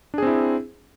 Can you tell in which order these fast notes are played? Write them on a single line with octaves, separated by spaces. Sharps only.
D4 G#4 C4 E4